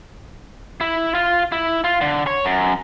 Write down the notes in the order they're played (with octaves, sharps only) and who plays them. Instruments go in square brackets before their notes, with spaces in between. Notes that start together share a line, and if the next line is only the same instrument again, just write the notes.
[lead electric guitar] E4
F4
E4
F4
D3
C#5
F#2